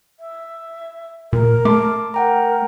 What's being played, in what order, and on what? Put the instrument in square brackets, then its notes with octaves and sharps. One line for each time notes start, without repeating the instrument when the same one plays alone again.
[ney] E5
[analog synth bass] A#2 [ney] A#4
[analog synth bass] A3 [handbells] A5 C6 D6
[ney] A#4 [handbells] F#5 G5 A#5